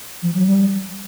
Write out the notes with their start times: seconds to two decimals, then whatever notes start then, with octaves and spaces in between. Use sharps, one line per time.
0.23 F3
0.34 F#3
0.46 G3